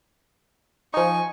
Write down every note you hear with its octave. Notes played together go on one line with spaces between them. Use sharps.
F3 D#4 G#5 C#6